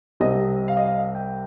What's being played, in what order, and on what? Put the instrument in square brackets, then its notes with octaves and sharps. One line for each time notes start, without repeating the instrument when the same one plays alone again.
[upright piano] C2 C3 G3 C4 D#5
F5
D#5
F5
G5